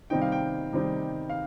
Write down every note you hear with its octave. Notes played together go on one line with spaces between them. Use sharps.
C3 D#3 G3 C4 D#4 G5
F5
G5
C3 D#3 G3 C4 D#4
F5